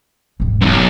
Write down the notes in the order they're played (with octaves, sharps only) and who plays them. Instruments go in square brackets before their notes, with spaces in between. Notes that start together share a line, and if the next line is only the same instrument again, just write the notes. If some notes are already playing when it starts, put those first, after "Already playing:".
[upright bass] D#1 G#1
[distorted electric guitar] B1 F#2